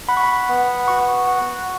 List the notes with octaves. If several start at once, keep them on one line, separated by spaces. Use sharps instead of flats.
F#5 B5
C#6
B5
B3
F#4 C#6
F#5